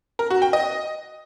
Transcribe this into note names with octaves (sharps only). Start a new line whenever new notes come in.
A#4
F#4
G5
D#5